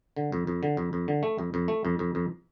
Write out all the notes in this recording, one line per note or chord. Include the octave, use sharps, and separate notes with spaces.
D3
F2
F2
D3
F2
F2
D3
A3
F2
F2
A3
F2
F2
F2